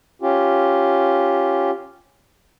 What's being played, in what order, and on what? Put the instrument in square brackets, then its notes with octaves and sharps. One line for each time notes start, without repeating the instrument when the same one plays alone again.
[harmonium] C#4 F4 G4